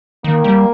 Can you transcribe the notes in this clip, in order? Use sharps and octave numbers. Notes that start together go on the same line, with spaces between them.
D#3 A#3
G3